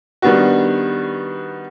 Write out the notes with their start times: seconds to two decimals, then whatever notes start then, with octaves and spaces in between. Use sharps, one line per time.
0.22 D#3 G3 B3 D4 F#4